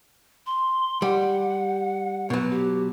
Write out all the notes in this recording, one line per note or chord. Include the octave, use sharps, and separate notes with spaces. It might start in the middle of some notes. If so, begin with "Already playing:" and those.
C6
G3 F#5
B2 F#3 B4
G4